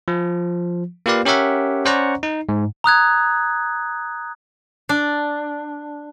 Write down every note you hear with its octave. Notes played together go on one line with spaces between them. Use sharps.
F3
A#3 F4 G4 B4 D5 F5
C#4 G4 A#4 C#5 E5 F#5
C#4 C5 D5 F#5 A#5 C#6
D#4
G#2
A#5 D#6 F#6 G#6
D4